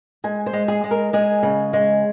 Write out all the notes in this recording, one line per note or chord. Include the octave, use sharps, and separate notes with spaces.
G#3 G#5
C5
G#3
G#4
G#3
A#4
G#3 G#4
C#3
G#3